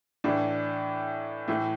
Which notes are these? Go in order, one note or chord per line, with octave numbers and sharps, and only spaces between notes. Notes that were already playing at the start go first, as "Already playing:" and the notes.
A2 E3 D4
A2 E3 A3